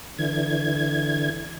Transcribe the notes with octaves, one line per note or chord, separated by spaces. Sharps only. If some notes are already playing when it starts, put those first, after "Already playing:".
D3 E3 G#6